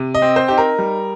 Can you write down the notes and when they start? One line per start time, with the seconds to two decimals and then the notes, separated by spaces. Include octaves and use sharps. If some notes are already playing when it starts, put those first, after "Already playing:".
Already playing: C3
0.15 D#5
0.22 C4
0.36 C5
0.48 D#4 G4
0.58 A#4
0.79 G3